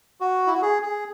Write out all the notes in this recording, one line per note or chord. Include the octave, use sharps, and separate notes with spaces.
F#4
E4
F#4
G#4
G#4